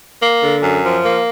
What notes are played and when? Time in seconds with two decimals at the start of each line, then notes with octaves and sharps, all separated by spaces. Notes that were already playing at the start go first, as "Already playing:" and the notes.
0.20 A#3
0.41 D3
0.62 F#2
0.83 F3
1.04 A#3